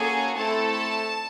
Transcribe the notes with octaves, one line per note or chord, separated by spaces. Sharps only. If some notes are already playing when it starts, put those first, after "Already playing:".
Already playing: A#3 C#4 F#4 G#4 A4 G#5
A3 C4 E4 A4 A5